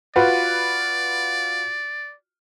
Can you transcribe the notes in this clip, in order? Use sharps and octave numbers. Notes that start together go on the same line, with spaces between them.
F4 F#4 B4 D5